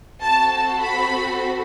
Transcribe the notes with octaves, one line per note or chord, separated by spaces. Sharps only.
C4 F#4 A4 A5
A5
B5